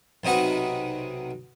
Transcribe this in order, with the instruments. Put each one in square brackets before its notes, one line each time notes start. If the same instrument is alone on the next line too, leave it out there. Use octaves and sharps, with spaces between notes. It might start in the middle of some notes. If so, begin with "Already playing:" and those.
[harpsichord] B1 C3 D#4 F#4 B4